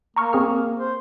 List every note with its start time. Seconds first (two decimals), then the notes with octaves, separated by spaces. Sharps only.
0.16 A#3 A#5 C#6 F6
0.33 C4 G#4 F6
0.79 C5